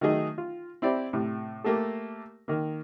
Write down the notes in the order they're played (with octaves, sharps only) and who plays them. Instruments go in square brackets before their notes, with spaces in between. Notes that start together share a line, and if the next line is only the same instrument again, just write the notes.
[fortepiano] D#3 F#3 A3 D#4 G#4 D#5
F4
C4 E4 G4 D5
A2 C3
A3 A#3 G4 A4
D#3 A#3